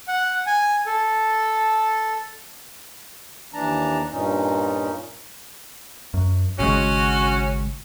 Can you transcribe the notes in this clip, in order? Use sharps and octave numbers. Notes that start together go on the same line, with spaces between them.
F#5
G#5
A4
D#2 E3 D4 A5 A#5
G2 A#2 C#4 D#4
F#2
G#1 C#3 G#3 C#4 F#4